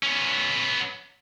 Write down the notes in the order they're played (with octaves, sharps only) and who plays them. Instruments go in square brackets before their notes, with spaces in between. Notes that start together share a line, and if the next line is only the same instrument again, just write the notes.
[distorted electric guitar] B3 C#4